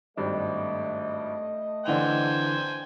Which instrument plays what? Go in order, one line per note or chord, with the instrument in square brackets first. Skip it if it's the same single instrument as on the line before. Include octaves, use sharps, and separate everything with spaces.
[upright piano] G#1 G2 [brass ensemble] A3 D#5
[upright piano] D3 E3 F7 [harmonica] C5 G5 G#5